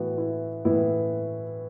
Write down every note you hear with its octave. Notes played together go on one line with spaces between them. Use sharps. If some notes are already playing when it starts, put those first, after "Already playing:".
Already playing: A2 E3 B3 F#4
E4
A2 E3 B3 E4